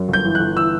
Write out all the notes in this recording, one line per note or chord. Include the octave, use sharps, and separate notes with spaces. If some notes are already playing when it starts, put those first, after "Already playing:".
Already playing: F#2
G1 G6
E3
F#6
G1
E3 E6